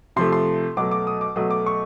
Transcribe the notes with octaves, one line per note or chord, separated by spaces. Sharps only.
C3 F3 A3 C6
C6
B2 F#3 A3 D6
D6
D#6
D6
B2 F#3 A3 D#6
D6
C#6